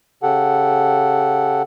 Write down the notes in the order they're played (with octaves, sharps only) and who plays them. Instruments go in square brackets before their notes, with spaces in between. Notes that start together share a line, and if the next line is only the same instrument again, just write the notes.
[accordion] C#3 G4 A4 F#5